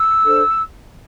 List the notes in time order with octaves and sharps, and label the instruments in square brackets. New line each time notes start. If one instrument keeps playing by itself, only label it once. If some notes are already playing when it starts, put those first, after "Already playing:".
Already playing: [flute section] E6
D4 A4 C5